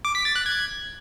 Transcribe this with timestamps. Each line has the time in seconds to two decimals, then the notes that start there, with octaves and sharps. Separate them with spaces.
0.05 D6
0.15 B6
0.25 A6
0.36 F#6
0.46 G#6